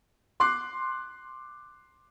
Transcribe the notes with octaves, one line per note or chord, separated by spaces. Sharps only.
C6 D6 F#6 C7